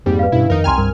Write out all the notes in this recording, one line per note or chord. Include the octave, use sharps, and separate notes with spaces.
F2 G#2 G3 A#3 C4
B4 F5
G2 B2 C#4 E4
F2 D#3 D#4 A#4
C2 G5 G#5 A#5 C6 F6
G2 A#4